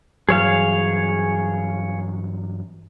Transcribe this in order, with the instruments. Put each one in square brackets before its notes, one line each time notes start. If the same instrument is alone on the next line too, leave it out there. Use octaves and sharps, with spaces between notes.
[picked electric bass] G2 E3 F#3 [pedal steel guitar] G#4 C#5 F5